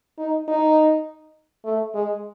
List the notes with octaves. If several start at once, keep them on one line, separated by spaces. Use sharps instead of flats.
D#4
D#4
A3
G#3